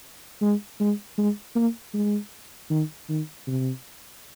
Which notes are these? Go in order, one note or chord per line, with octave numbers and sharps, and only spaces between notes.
G#3
G#3
G#3
A#3
G#3
D#3
D#3
C3